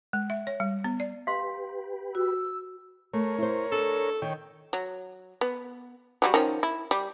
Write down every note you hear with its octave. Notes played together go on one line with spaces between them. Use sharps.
G#3
E5
C#5
G3
B3
D5
G4 B4 F5 C6
F#4 E6
A3 A#4 C#5
E4 C5
D4 A4
D#3 C#5 G5
F#3
B3
F#3 G3 F#4
D#3 F3 C#4
E4
G3